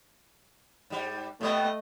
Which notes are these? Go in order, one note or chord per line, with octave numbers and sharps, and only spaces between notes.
G#2 G3
A2 G3 A3 B3 D#5